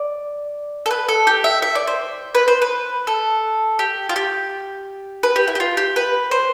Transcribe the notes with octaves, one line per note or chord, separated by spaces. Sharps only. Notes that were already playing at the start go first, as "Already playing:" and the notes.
Already playing: D5
A4
B4
A4
G4
E5
E5
D5
C5
B4
C5
B4
A4
G4
F4
G4
B4
G4
E4
G4
F4
G4
B4
C5